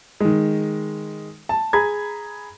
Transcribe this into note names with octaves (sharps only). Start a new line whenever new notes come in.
D#3 G#3
A5
G#4 A#5 B5 G#6